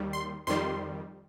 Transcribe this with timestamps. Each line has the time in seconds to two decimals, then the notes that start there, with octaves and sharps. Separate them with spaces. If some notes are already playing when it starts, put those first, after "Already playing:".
Already playing: D#2 D#3 G3
0.13 C6
0.47 F2 D#3 G3 C6